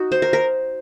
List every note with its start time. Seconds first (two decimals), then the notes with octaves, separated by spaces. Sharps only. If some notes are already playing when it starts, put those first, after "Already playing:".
Already playing: D#4 F#4
0.12 C5
0.22 A#4
0.33 A#4